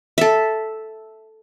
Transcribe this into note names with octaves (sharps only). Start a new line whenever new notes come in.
A4 E5